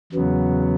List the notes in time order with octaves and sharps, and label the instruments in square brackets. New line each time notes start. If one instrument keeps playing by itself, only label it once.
[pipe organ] E2 C#3 F#3 B3